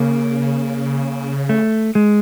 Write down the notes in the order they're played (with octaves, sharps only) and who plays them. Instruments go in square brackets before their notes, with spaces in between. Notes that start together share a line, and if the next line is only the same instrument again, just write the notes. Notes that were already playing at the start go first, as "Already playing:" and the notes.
Already playing: [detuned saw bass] C#3 [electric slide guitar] A#3
[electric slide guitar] A3
G#3